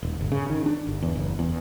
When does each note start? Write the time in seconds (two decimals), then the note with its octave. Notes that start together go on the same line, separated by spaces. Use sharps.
0.03 D#1
0.21 G1
0.32 C#3
0.50 D#3
0.66 D4
0.87 G1
1.02 E2
1.15 F#1
1.39 E2